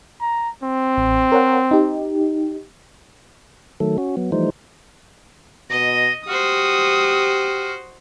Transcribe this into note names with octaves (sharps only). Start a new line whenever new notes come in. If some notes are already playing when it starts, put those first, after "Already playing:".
A#5
C4
A1
A#4 C#5 F#5
D#4 G4
D#3 F#3 A3 A4
C#4 F#4
F#3 B3
E3 F3 G3 A3 D#4 C5
B2 D#5 A#6
F#4 G4 C5 D#6 F6